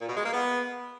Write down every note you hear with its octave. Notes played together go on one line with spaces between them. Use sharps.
A#2
B2
G#3
A#3
B3